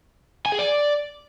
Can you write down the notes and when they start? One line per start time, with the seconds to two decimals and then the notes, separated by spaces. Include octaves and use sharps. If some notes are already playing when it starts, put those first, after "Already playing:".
0.46 G#5
0.52 G#4
0.59 D5